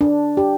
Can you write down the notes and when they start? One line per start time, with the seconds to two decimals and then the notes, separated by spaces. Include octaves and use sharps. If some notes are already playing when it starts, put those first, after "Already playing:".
0.01 D4
0.37 G4